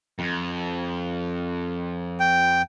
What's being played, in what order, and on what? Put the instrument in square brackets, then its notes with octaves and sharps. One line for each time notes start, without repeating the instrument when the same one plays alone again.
[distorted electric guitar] F2
[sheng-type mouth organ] G5